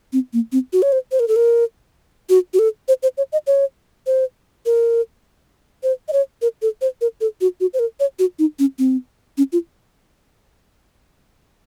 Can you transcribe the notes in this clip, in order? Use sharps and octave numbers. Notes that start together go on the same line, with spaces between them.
C4
A#3
C4
F#4
C#5
C5
C5
A#4
A4
A#4
F#4
F#4
A4
C5
C5
C#5
D#5
C#5
C5
A#4
C5
D#5
C#5
A#4
A4
C5
A#4
A4
F#4
F#4
C5
A#4
C#5
F#4
D#4
C#4
C4
C#4
F4